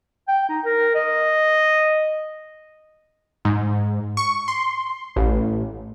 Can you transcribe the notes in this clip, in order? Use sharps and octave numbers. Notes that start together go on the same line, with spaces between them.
G5
D#4
A#4
D#5
G#2
C#6
C6
A1